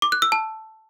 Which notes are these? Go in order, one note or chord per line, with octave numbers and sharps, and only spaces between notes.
D6
F#6
E6
A5